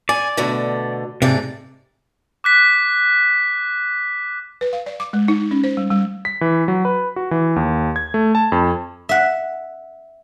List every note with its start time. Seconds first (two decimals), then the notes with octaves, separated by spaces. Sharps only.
0.09 D5 G#5
0.37 B2 D3 A3
1.22 G#2 C3 A3 D5
2.44 D6 F#6 B6
4.61 B4
4.73 F5
4.86 D5
5.00 D6
5.13 G#3
5.28 D#4
5.51 C#4
5.64 C5
5.77 G3
5.90 G3
6.25 B6
6.41 E3
6.68 F#3
6.85 B4
7.16 F#4
7.31 E3
7.56 D#2
7.96 G#6
8.14 A3
8.35 A5
8.52 F2
9.09 E5 F#5